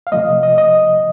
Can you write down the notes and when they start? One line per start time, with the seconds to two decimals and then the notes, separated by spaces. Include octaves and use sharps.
0.07 F5
0.12 C3 F3 A3 D#5
0.43 D#5
0.58 D#5